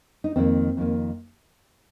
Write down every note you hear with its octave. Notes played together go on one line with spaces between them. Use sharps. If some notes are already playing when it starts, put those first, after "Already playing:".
D#4
F2 D#3 A#3 C4
F2 D#3 A#3